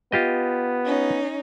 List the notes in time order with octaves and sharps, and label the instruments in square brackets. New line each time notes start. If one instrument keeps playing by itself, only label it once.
[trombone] B3 [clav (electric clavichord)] F4 G4 D#5
[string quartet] C#4 D#4